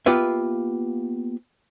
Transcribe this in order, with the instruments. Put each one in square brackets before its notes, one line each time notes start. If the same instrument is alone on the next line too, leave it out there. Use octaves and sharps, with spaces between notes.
[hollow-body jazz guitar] A#3 B3 F4 G4 B4 E5